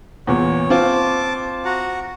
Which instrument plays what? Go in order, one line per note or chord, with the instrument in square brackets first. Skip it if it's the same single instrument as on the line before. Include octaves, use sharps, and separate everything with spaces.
[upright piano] E2 A#2 [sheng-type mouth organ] C#5
[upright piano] C4 F4 [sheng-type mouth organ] A5 D6
[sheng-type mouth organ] F#4 F#5 A#5